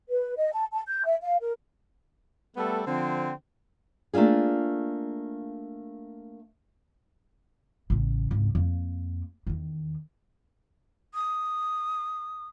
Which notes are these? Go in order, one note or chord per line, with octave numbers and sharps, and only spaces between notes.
B4
D#5
A5
A5
G6
E5
F5
A#4
G3 A3 B3 A4
D3 F3 C4
A3 A#3 D4 F4 G#4
A1 C#3
G#1 C#2
F2 A#3
E2 D#3
D#6